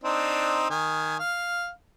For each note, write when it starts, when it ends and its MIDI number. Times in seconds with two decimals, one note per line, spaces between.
0.04 0.68 60
0.04 0.68 62
0.04 0.68 63
0.70 1.18 51
0.70 1.18 80
1.19 1.70 77